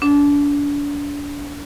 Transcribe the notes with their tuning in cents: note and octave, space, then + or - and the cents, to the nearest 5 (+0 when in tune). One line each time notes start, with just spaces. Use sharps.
D4 -35